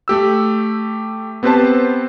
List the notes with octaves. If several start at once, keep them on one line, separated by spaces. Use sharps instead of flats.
A3 G4 E6
B3 C4 G4 B4 C5 A5